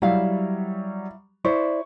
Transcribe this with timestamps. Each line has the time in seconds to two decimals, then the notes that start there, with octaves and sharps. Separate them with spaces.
0.02 F#3 G3 E4 F5
1.45 E4 C5 D5 C#6